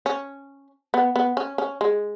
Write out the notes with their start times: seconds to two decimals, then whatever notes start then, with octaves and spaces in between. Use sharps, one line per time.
0.06 C#4
0.94 B3
1.16 B3
1.37 C#4
1.58 C#4
1.81 G#3